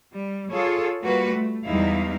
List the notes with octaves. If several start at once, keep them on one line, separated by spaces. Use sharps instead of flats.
G3
F4 G#4 A4 C#5
G3 A#3 F4 F#4 B4
A3
E2 G3 G#3 D#4 E4 F5